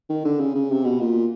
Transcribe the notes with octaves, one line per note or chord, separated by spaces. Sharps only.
D#3
D3
C#3
C#3
C3
B2
A#2